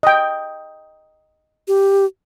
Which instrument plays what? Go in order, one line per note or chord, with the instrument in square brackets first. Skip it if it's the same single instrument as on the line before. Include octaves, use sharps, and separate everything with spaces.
[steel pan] D#5 G5
[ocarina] G4